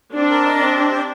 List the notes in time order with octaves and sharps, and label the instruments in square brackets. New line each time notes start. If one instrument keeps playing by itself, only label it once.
[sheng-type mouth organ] C4 [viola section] D4
[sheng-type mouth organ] A#4
D#5
C4
G4
G4